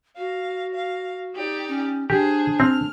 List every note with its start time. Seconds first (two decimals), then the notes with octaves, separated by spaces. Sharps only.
0.17 F#4 F5
0.74 F5
1.35 D#4 G4 D5
1.68 C#4
2.10 D4 G4 G#4 C5
2.60 C4 F6